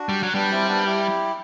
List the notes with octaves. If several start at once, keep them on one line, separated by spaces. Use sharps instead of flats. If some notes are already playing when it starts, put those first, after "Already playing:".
Already playing: D4 F#4
G3
F#3
G3 B3 D4
C4 E4
B3 D4
E4 G4